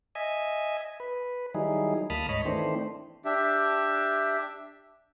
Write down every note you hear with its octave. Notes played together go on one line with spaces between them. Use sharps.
D#5 E5 G#5
B4
D#3 F#3 G3 D#4 E4 G#4
D2 A#3 A5 B5 D#6 F6
G#2 C#5 D#5 B5
D#3 E3 A3 C4 D4 C5
D4 G4 E5